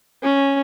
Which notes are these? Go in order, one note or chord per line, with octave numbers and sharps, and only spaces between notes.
C#4